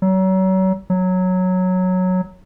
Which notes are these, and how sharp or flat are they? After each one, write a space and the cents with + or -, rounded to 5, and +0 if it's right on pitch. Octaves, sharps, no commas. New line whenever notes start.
F#3 +35
F#3 -5